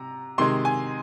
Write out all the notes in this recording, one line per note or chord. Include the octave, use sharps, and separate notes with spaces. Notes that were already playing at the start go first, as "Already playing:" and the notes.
Already playing: C3 A#5
C3 D#3 G#3 C6
G#5